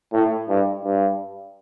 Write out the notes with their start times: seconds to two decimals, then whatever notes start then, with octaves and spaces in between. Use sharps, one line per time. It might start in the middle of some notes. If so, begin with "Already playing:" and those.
0.13 A2
0.49 G2
0.84 G2